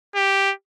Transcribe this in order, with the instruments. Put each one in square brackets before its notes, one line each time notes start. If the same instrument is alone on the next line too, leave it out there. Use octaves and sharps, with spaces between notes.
[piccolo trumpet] G4